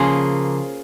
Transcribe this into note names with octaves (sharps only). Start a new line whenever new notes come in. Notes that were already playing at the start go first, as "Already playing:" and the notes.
Already playing: C#3 F3 A#3 F4 G#4